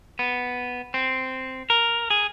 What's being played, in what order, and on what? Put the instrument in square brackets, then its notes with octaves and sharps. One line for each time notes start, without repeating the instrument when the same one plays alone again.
[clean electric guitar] B3
C4
A#4
G#4